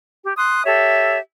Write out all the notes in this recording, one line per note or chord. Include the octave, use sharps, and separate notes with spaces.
G4
C6 D#6 F#6
G4 A4 C#5 E5